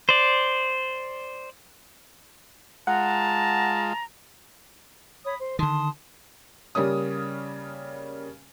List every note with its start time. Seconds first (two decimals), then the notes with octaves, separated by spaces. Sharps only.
0.09 C5 D5
2.87 G#3 F4 F#5 A5 A#5
5.25 C#5 B5 D#6
5.38 C5
5.59 D3 D#3 A5 C6 D#6
6.75 C#3 G3 A#3 C#4 D#6